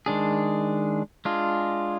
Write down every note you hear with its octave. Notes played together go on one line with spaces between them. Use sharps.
D#3 G#3 D4 G#4
G#3 D4 F4 G#4